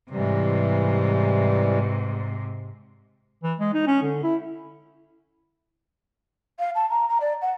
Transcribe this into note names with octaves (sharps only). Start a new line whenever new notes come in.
G#2 C3 E3 G3
E3
G#3
D#4
C#4
D3
E4
F5
A5
A#5
A#5
D5
F#5